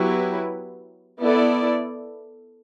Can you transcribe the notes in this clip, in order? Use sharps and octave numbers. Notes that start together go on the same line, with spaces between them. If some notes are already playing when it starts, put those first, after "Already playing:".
Already playing: F#3 B3 E4 G4 B4
B3 E4 A4 D5